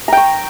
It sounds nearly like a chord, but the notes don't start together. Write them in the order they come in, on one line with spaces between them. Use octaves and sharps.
A#5 G5 C#6